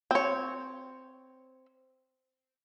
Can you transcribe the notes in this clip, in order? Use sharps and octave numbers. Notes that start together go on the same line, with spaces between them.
C4 C#5